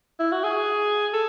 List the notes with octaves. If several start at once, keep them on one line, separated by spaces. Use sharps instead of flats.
E4
F#4
G#4
A4